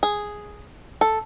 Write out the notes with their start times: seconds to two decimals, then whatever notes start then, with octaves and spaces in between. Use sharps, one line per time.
0.03 G#4
1.01 A4